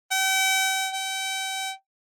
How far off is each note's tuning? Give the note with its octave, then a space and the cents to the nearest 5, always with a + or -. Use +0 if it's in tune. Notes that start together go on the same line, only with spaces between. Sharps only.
G5 -40
G5 -35